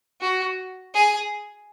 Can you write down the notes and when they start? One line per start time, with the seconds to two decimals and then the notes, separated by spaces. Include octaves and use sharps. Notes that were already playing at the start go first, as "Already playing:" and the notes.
0.21 F#4
0.94 G#4